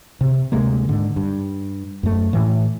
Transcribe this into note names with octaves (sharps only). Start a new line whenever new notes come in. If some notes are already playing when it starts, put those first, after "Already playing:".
C3
D2 C3 G#3 A#3
G#2 D3
G2
F#2 A3
A2 E3